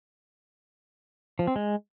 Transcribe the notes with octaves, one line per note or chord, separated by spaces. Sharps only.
F3
C4
G#3